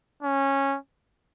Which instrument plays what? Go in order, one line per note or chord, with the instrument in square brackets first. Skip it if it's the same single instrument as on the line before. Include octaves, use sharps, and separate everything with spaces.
[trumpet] C#4